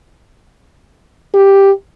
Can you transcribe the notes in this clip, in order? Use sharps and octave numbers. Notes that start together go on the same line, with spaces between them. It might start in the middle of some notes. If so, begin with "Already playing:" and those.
G4